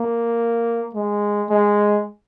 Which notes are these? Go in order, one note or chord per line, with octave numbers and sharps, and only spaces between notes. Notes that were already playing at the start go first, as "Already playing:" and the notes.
Already playing: A#3
G#3
G#3